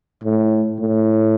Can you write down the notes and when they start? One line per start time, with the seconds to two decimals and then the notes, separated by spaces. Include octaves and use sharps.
0.24 A2
0.80 A2